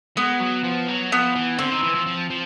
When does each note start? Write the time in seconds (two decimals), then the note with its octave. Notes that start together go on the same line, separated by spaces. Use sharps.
0.17 G#3 B3
0.40 F#3
0.64 F3
0.88 F#3
1.12 F3 B3
1.35 E3
1.59 D3 C4
1.71 D#3
1.83 E3
1.95 F3
2.06 F3
2.30 F3